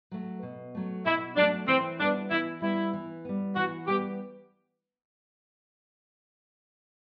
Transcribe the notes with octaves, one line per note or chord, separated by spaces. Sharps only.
F#3 A3
B2
F#3 A3
B2 E4
F#3 A3 D4
E3 C4
G3 B3 D4
E3 E4
G3 B3 E4
E3
G3 B3
E3 F#4
G3 B3 G4